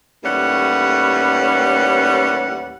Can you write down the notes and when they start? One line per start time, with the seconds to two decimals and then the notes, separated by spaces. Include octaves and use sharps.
0.24 D#2 A2 E3 G3 C#4 F#5